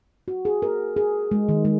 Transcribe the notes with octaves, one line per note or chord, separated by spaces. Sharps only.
F#4
G#4
A#4
G#4
G#3
D#3
G#3